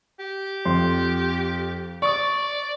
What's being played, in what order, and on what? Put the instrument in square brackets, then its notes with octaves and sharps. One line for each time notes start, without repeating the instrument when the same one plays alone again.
[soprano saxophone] G4
[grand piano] F2 C6
[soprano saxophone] D5 [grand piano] C#6 D#6